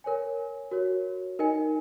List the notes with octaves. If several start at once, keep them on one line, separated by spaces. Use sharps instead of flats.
A#4 C#5 G#5
F#4 A#4 C#5
D#4 A#4 D#5 G#5